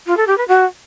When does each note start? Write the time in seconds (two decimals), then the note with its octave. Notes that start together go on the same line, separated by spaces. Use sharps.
0.06 F4
0.17 A4
0.27 G4
0.37 B4
0.48 F#4